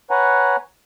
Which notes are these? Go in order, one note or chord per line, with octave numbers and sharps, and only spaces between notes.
B4 C#5 F#5 G#5 A#5